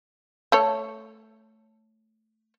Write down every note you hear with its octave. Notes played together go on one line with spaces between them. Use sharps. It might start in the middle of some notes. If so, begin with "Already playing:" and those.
A3 A4 C#5